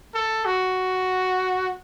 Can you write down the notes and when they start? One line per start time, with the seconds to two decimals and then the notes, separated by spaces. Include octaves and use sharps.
0.15 A4
0.45 F#4